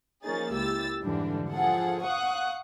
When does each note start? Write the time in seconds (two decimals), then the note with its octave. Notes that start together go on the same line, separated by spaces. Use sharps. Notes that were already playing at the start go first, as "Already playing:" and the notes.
0.24 F3 A#3 C#4 D#4 G#4 A6
0.53 C#2 E4 G4 E6 A6
1.03 F2 G#2 D3 E3 G3 D4
1.52 F3 G#4 A4 F#5
2.04 F5 F#5 C#6 D#6 F#6